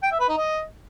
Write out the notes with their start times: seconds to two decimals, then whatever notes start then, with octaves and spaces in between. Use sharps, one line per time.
0.03 G5
0.11 E5
0.20 B4
0.29 D#4
0.37 D#5